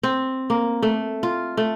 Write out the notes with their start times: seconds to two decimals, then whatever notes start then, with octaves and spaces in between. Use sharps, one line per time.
0.03 C4
0.50 A#3
0.83 A3
1.23 F4
1.57 A3